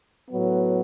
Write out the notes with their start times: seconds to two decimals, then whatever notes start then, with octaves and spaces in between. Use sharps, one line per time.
0.30 A2 F#3 B3